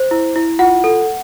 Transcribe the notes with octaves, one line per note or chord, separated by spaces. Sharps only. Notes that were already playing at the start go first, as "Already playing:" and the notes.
Already playing: C5
E4
E4
F4 F#5
A4